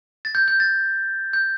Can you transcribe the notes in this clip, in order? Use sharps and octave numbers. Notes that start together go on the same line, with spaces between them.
A6
G6
G6
A6
G6